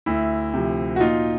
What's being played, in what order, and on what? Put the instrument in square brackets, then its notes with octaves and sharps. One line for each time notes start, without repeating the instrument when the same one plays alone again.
[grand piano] D2 E4
C3 F3
F#4
A#2 D#4 F4